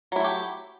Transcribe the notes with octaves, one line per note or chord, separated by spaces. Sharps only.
F#3 A3 E4 G4